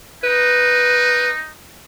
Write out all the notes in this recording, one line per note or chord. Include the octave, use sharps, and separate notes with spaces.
D#4 B4